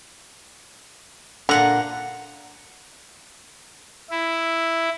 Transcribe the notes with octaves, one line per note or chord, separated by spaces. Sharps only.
A#2 D3 F#5 A#5
E4